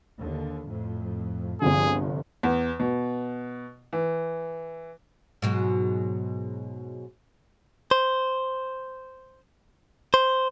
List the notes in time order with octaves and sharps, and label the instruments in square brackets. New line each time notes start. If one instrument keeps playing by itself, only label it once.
[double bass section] D#2 D3
F2 A2
[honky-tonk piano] G1 C2 D3 [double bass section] G2 F3 [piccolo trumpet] G#4
[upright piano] E2
B2
E3
[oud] G#2 B2 F#3
[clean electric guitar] C5
C5